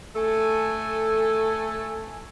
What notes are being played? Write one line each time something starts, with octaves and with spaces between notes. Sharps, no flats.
A3 A4 G#5